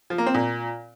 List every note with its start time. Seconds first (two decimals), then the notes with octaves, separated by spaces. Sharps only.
0.10 F3
0.18 A#3
0.26 C4
0.34 A#2